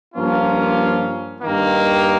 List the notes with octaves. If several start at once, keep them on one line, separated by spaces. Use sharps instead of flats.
G2 F3 A#3 C#4 F4
G2 D#3 A#3